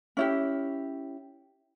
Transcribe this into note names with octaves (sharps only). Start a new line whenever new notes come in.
C#4 E4 G4